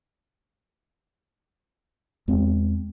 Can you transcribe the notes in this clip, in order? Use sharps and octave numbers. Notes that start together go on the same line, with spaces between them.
E2 G#3 C4